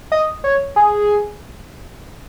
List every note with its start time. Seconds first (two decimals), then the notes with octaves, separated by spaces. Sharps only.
0.12 D#5
0.44 C#5
0.76 G#4